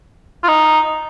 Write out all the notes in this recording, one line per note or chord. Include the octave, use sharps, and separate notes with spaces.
F4
D#4